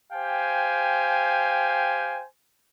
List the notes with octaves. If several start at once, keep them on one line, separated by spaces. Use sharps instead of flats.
G4 C5 F5 G5 G#5